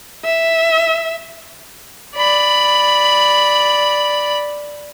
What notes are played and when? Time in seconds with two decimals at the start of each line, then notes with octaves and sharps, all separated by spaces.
0.25 E5
2.17 D5 B5